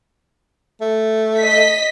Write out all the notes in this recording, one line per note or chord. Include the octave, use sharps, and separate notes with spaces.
A3
D#5 B6